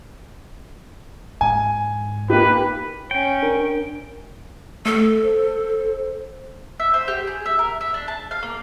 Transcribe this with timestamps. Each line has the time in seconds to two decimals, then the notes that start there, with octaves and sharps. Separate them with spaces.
1.41 G#2 G#5
2.30 A#3 D#4 G4 B4
3.11 C#4 G5
3.43 D4 A#4
4.86 A3 A4
5.23 C5
6.80 E5
6.94 C5
7.08 G4
7.27 G#4
7.46 E5
7.59 A#4
7.81 E5
7.94 D4
8.08 A5
8.31 F5
8.43 A#3